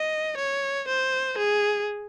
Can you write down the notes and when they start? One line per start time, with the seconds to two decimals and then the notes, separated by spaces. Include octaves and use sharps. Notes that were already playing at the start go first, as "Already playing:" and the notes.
Already playing: D#5
0.37 C#5
0.88 C5
1.38 G#4